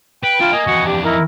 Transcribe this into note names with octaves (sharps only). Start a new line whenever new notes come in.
B4 G5
D4 E4 F4
A#3 D#5 G#5
F2 E3 F#4
D4 G4
D#4 E4 A#4